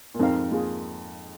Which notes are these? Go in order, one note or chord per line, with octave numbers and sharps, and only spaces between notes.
A#2
F2 G#2 C4 D#4 A#4 F5
A#3 F4 G#4